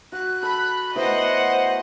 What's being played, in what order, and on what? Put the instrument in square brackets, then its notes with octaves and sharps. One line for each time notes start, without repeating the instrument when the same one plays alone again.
[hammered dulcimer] F#4 [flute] F#6
[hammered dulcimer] A4 [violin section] B5
[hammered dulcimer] A3 B3 E4 [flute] C5 [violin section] D#5 F#5
[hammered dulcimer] C#5